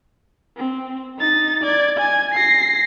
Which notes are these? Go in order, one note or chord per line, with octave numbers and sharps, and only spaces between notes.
C4
D#4 A6
D5 G#6
G#5 G#6
A#6 C7